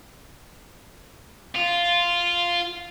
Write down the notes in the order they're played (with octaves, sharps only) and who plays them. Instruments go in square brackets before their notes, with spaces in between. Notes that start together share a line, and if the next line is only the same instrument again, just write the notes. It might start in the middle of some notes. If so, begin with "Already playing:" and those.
[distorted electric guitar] F4